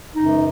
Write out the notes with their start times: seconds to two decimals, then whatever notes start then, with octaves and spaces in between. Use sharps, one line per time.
0.15 F#2 C#3 E3 G#3 D#4